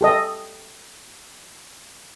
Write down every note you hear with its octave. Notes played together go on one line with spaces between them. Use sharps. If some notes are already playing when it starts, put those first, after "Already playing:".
G4 A4 D#5